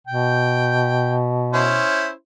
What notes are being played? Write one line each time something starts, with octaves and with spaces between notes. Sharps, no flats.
B2 G5
C#4 E4 C5